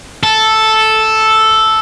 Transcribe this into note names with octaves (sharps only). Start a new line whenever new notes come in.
A4